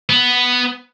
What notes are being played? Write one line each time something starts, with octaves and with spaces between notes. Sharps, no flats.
B3